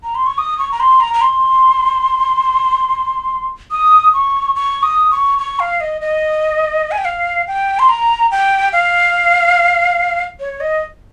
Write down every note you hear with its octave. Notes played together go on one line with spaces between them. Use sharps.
A#5
C6
C#6
D#6
C#6
A#5
C6
A#5
A#5
C6
D#6
C#6
C#6
D#6
C#6
C#6
F5
D#5
D#5
G#5
G5
F5
G5
C6
A#5
G5
F5
C#5
D#5